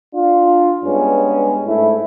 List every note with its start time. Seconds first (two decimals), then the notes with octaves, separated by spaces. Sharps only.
0.13 D4 F4
0.84 G2 G#3 B3 C#4
1.66 G#2 A3 E4